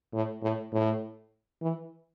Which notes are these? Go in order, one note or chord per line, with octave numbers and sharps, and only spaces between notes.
A2
A2
A2
E3